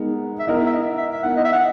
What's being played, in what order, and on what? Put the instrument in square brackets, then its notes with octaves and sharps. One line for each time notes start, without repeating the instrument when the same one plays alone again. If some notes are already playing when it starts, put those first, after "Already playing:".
Already playing: [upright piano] G#3 B3 D#4 A#4
[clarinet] E5
[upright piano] B3 E4 A#4 [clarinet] D#5
[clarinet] E5
D#5
E5
E5
[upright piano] B3 E4 A#4 [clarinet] F#5
[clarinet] D#5
E5
F#5